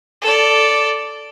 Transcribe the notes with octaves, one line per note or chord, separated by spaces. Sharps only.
A4 D5